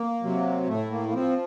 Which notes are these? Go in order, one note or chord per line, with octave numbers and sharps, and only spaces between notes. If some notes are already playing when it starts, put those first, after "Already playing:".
Already playing: A#3
C3 F#3
A2 A3
A#3
A#3
F3 C4